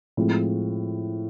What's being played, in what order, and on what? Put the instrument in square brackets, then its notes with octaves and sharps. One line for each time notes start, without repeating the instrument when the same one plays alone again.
[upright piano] A2 F3 G#3 C4 F4